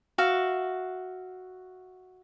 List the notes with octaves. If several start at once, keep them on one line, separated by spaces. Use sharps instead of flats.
F#4 E5 F5